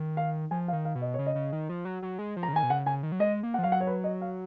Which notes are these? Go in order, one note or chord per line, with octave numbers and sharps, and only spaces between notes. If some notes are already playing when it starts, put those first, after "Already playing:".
Already playing: D#3
F5
F3 G#5
F5
D#3
F5
B2
D#5
C#3 C#5
D#5
C#3
D#3
F3
F#3
F#3
G#3
F3
A#5
C#3
D#3 G#5
B2
C#3 F#5
C#3 G#5
D#3
F#3
G#3 D#5
A#3
F#5
F3
F#3 F5
F#5
C#5
B4
D#5
F5